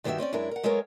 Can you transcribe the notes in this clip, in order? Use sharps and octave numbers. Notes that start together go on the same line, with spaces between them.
G2 D#3 C4 F#4 G4 E5
C4 C#4 E4 D5
F#2 G#3 D4 E4 A#4
A#4 F#5
F#3 G#3 A3 B3 A#4 C#5